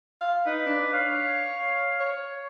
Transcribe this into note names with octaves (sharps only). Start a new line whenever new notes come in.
F5
D#4 B4
D4
C#5 F5
C#5